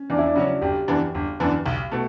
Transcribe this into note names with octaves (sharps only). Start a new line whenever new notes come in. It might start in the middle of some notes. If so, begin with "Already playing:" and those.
Already playing: C#4
E2 D4
E4
D4
C#3 F#3 C#4 F#4
G1 G4
F#2 E3 B3 D4
G1
F#2 E3 B3 D4
B1
B2 A3